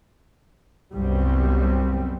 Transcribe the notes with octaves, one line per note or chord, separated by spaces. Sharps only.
C2 F#2 G3 B3 C4